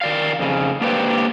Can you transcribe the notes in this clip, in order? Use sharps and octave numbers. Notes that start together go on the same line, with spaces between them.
D#3 D5 F5
F2 C#3
A#3 D4 G4 B4 C5